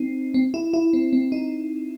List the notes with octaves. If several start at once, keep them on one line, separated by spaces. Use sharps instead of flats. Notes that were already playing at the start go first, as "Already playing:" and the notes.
Already playing: C4 D#4
C4
E4
E4
C4
C4
D#4